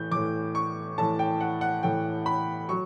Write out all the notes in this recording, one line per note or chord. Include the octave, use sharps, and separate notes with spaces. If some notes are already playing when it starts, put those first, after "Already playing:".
Already playing: A2 E3 G6
A2 E3 D6
C#6
A2 E3 A5
G5
F#5
F#5
A2 E3 G5
B5
F#3 C#6